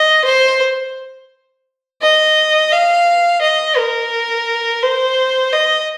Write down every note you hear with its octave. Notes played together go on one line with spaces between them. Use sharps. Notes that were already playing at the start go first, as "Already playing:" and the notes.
Already playing: D#5
C5
D#5
F5
D#5
A#4
C5
D#5